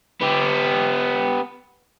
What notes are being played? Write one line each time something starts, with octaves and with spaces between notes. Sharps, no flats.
B3 G4